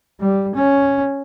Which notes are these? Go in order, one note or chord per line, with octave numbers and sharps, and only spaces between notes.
G3
C#4